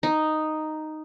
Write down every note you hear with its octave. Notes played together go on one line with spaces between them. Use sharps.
D#4